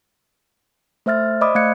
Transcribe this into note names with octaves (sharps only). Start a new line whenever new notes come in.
A3 C5 E5 F6 A6
C5 D5 D#5 B5 D6 D#6
A3 F5 F#6 G#6 C#7